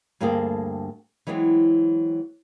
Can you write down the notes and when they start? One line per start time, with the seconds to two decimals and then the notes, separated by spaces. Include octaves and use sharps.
0.20 D2 G2 A#3 C4 G#4 A4
1.27 E3 F#3 G#3 B3 C4